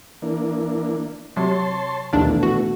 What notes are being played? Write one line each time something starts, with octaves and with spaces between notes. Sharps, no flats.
E3 A#3 D4
C3 F#3 C#5 A5 C6
A#1 D#2 B2 E3 A3 D4
F#4